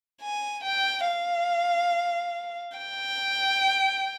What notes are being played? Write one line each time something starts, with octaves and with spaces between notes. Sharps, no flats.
G#5
G5
F5
G5